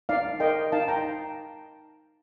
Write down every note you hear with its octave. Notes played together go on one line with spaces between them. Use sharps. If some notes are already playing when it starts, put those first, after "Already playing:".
D#4 D5 F5
A#4 D#5 G5
D#4 F5 A5
G5 A#5